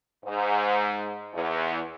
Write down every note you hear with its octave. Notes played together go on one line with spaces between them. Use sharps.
G#2
E2